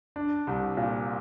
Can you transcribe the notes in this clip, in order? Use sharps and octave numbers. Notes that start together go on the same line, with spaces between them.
D4
C2
A#2